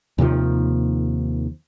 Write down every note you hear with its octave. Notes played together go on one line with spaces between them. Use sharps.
D#2 C3 D#3 F3